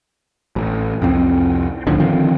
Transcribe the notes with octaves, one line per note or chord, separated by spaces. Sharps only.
A1
C2 F2 C4
C#2 A2 D3 F3
D3 D#3 F3 C4